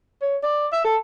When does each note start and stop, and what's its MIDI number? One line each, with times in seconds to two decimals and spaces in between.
0.21 0.37 73
0.43 0.67 74
0.72 0.83 76
0.84 0.96 69